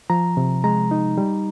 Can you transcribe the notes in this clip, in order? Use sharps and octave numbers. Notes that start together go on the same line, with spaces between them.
F3 A#5
C3
G#3 A#5
D#4
G3